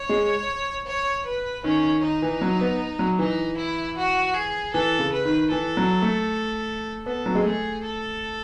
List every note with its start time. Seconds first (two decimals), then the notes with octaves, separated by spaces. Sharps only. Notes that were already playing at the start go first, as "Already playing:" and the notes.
Already playing: C#5
0.09 G#3
0.87 C#5
1.26 B4
1.64 D#3 C#4
1.84 D#3
2.03 D#3 D#4
2.22 E3
2.41 F#3
2.61 B3
2.99 F#3
3.19 E3 D#4
3.57 E4
3.97 F#4
4.35 G#4
4.73 E3 A4
4.99 C#3
5.12 B4
5.25 D#3
5.51 E3 A4
5.77 F#3
6.02 A3
7.06 B3 A4
7.26 F#3
7.35 G#3
7.44 A3 G#4
7.84 A4